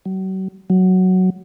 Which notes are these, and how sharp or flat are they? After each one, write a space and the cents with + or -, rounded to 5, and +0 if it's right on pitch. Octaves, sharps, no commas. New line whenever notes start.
F#3 +40
F#3 +5